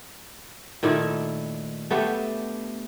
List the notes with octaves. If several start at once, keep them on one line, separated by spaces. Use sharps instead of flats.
A#2 D#3 A3 E4
A3 B3 D4 G4